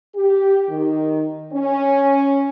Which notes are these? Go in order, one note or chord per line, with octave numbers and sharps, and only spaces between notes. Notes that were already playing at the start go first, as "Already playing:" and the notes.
G4
D#3
C#4